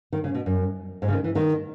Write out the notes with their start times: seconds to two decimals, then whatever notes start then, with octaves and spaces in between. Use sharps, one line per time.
0.12 D#3
0.24 C#3
0.35 B2
0.46 F#2
1.02 G#2
1.08 C#3
1.13 D#3
1.24 E3
1.35 D#3